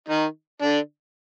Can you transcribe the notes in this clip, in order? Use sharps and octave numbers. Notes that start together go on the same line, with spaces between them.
D#3 D#4
D3 D4